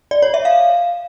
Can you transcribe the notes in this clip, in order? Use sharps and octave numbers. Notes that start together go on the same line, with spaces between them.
D5
C#5
E5
F5